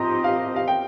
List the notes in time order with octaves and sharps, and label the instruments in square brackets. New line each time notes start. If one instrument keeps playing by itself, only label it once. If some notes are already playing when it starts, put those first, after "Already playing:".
Already playing: [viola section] F3 C4 D#4 G4 D#5 [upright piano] A#5 C6
[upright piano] F5
F5
G5